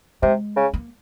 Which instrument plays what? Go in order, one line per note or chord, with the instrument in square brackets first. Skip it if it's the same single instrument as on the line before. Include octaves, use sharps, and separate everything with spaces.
[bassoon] C3 [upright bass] G#3
[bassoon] C#3
[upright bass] A#3